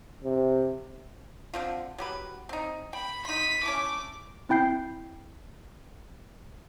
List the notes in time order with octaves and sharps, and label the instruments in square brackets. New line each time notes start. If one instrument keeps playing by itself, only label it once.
[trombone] C3
[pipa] D3 C4 F4
F#3 G4 B4
C4 D#4
[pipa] G5 [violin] B5
[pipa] D#4 C6 [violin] B6 D#7
[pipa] E3 A3 C#4 [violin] D6
[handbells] C4 E4 G5 G6 C7